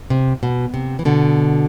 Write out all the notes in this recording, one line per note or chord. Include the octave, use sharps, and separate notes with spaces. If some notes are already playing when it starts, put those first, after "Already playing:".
C3
B2
C3
E3
B2 D3